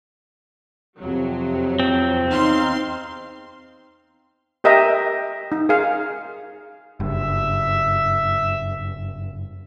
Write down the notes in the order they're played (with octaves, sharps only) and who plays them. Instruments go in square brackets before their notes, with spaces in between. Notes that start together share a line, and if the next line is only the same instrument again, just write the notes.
[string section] F2 F#3 [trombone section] C3
[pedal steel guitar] C4
[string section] E2 F5 C6 [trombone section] D#4
[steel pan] G4 A#4 D#5 E5 G5 A#5
D#4
G#4 A#4 F5
[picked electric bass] F#1 G2 [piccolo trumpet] E5